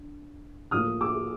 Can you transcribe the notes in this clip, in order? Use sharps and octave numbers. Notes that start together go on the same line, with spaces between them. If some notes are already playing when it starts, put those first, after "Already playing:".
Already playing: D3
A2 F3 A#3 D#6 F6
D6 E6